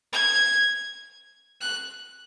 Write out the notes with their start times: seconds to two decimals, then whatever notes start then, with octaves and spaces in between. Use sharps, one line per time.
0.13 G#6
1.61 F#6